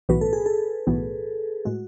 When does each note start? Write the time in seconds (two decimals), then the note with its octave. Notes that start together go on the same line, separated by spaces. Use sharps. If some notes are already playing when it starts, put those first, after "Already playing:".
0.09 B1 A2 E3 B3 F#4 B4
0.21 A4
0.33 G#4
0.46 A4
0.87 B1 A2 E3 B3 F#4
1.65 A2 G#3 F#4